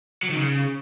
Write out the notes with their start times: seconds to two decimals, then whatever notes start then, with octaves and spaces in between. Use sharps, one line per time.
0.23 F#3
0.30 D#3
0.36 C#3